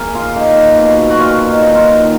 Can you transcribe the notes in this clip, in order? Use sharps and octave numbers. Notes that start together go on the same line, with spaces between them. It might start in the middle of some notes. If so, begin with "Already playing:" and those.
Already playing: A#3 G#4 A#4
F4
A#3 D#4
B2
F#4
A#2 F4
D#4
A#2
D#4
F4
D#3